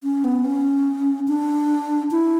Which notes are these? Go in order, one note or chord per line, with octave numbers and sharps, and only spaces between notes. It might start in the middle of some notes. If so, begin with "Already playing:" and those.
C#4
B3
C#4
D4
E4